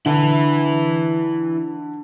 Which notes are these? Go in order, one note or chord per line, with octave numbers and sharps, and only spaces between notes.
D3 E4 B4